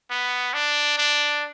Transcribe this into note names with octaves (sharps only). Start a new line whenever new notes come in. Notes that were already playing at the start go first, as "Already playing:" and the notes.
B3
D4
D4